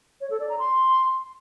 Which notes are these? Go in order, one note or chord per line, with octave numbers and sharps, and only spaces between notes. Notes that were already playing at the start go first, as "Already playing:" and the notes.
C#5
A4
D5
A#5
C6